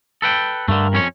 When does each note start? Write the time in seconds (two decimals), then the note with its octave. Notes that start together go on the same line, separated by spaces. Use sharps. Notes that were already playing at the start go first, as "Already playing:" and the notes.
0.22 A4 B4 G5
0.68 G2 D3 A3 A#4
0.93 F2 C#4 C#5